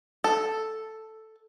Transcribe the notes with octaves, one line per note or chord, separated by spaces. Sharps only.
A4